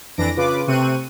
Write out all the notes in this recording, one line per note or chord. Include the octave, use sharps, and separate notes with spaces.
F2 E3 D4 A#6 D7
C#3 F4 B4 D6
C3 A3 C4 C#6 F#6 D#7